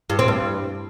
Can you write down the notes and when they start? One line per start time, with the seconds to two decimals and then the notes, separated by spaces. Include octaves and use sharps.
0.10 G2
0.19 C4
0.28 G2